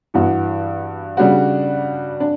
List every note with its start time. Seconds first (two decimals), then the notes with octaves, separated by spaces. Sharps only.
0.14 G2 E3 B3 F#4
1.17 C#3 G3 D4 F#4
2.20 D4